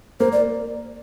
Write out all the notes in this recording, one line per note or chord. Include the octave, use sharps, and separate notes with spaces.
A#3 C5
D5